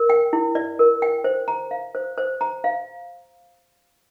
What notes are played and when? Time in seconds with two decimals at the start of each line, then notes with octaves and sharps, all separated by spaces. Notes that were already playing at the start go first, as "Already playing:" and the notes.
Already playing: A#4
0.10 G5
0.33 E4
0.55 D5
0.79 A#4
1.02 G5
1.24 C5
1.48 A#5
1.71 F5
1.95 C5
2.18 C5
2.41 A#5
2.64 F5